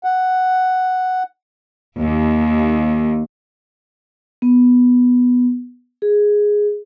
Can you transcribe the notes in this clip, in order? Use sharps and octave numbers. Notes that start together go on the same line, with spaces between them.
F#5
D#2
B3
G#4